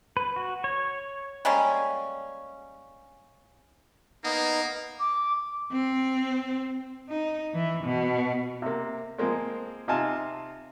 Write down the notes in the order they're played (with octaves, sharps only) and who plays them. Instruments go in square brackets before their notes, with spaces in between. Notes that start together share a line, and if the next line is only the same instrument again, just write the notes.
[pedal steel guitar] B4
F#4
C#5
[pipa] G3 G#3 A#3 C#4
[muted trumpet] A#3 [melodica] B3 D#4
[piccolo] D6
[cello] C4
D#4
E3
B2
[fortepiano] C3 A#3
F3 G#3 A#3 C4
C3 D#4 F4 G#5 A5 F6